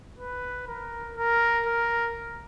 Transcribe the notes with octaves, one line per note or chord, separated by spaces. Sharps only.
B4
A#4
A#4
A#4